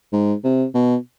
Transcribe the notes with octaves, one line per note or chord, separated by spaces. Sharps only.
G#2
C3
B2